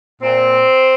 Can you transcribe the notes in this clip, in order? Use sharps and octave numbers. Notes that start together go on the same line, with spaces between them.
A#2 C4